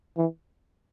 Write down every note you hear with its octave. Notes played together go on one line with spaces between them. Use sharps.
E3